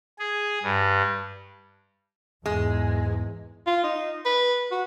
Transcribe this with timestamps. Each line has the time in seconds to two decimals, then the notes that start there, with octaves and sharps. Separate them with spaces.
0.19 G#4
0.62 G2
2.46 E2 G#2 G#3
3.67 F4
3.84 D#4
4.25 B4
4.71 F#4